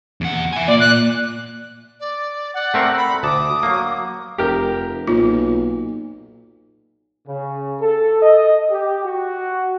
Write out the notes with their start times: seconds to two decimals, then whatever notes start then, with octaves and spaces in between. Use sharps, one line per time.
0.21 E2 F#5
0.53 E5 G#5
0.68 A#3 F4 D5
0.80 F#6
2.00 D5
2.54 D5 F#5
2.74 A3 C4 A#4
2.97 B5
3.23 D2 A5 D6 D#6
3.63 F#3 A#3
4.38 F1 G4 A#4
5.07 B1 A#2 F4
7.26 C#3
7.80 A4
8.21 D#5
8.70 G4
9.04 F#4